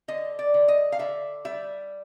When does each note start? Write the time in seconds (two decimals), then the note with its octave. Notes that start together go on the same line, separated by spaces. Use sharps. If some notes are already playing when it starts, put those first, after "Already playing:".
0.08 D3 D#5
0.39 D5
0.54 D3
0.68 D#5
0.92 F5
0.99 D3 E5
1.45 G3 E5